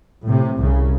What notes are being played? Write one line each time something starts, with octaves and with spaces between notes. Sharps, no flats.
A2 C3
C2 C#3